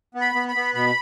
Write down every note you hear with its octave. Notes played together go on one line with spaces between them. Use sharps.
B3
B5
B3
B5
B3
B2 B5